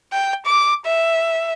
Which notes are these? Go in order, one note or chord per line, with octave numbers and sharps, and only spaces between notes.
G5
D6
E5